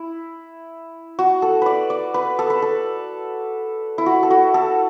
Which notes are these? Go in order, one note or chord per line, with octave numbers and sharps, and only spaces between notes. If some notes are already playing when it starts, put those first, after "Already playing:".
Already playing: E4
F#4
A4
B4 D5
D5
B4
A4
B4
A4
E4
F#4
A4
F#4
A4